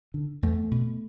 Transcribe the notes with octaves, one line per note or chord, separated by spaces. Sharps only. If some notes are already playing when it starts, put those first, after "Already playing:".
D3
E2 A3
B2